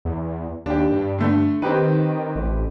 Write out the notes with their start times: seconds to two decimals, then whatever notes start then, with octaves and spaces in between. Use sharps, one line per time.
0.05 E2
0.66 D#2 D4 G4
0.93 G2
1.18 D3 A3
1.62 D#3 C4 G4 B4
2.36 A1